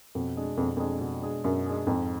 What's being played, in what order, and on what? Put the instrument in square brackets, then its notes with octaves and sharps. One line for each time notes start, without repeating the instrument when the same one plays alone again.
[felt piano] F2 [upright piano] B2
[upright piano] G#3 D4 G#4
[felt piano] F2 [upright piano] B2
[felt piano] F2 [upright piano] G#3 D4 G#4
[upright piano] B2
G#3 D4 G#4
[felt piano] F#2 [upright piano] B2
[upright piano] G#3 D4 G#4
[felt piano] F2 [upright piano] G#2